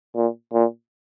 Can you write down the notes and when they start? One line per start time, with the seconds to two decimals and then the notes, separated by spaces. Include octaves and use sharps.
0.15 A#2
0.53 A#2